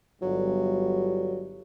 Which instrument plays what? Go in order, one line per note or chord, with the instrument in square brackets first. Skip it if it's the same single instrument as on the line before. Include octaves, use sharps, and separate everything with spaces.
[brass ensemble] G1 G3 [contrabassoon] F#3